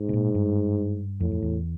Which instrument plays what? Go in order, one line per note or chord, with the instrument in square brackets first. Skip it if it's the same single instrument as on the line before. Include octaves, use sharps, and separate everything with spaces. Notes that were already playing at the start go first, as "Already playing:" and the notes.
Already playing: [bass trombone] G#2
[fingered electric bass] B2
A#2
G2
[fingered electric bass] F2 [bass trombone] A2
[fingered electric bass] F2
E2